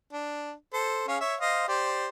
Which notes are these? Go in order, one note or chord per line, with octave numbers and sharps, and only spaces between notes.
D4
A4 C5
C#4 G#4 F5
C#5 E5
C5 D#5 F5
G4 C5 D5